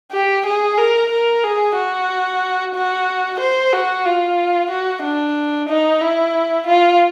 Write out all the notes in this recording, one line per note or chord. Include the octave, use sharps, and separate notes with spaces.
G4
G#4
A#4
A#4
G#4
F#4
F#4
C5
F#4
F4
F#4
D4
D#4
E4
F4